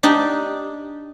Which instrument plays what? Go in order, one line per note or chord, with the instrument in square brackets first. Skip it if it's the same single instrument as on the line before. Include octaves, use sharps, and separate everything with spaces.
[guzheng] D4 D#4 G4